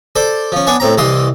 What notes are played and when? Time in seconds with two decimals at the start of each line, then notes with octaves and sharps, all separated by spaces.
0.16 A4 C5 D5
0.52 F3 C#4
0.67 B3 D4 C#5 G#5
0.80 A2 C4 A#5
0.97 C2 E3 D#5 C6